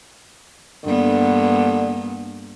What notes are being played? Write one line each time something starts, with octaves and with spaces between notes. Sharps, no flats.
G2 D3 A#3 B3